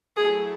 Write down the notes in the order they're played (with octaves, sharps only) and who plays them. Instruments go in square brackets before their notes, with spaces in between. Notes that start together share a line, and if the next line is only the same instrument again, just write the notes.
[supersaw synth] F#3 A3 E4 A4 [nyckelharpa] G#4